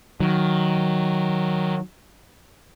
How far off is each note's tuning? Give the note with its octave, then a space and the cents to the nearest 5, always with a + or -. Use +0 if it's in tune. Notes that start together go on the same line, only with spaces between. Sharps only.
D#3 +0 F#3 +0